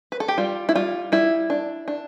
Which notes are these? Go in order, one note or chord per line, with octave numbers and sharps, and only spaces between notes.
B4
A4
G4
G3 F4
E4
G3 F4
G3 E4
D4
D4